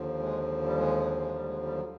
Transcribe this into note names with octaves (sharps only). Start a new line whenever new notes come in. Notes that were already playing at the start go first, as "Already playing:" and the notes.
Already playing: D#2 D3 F3
G#3
G3
G#3
G#3
G3
G#3
G3
F#3